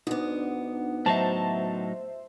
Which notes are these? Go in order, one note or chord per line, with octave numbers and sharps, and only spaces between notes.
D2 B3 D4 D#4
A2 F#3 D#4 C5 E5 A5